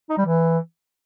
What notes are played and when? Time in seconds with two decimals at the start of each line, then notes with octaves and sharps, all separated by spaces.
0.10 D#4
0.18 G3
0.26 E3